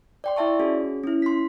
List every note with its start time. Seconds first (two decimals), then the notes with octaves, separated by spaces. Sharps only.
0.24 D5 G5 C6
0.37 E4 D5 E5 A5 C#6
0.60 C#4 F#4 G#4
1.04 C#4 E4
1.22 C6 B6